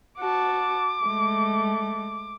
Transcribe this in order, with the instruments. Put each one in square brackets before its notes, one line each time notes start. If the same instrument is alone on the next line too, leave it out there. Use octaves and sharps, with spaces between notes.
[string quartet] F#4 A5 [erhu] D6
[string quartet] G#3 A3